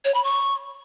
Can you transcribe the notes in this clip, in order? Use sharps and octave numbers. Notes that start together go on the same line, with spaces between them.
C#5
B5
C#6